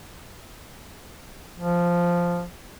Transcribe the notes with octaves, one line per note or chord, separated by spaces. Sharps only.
F3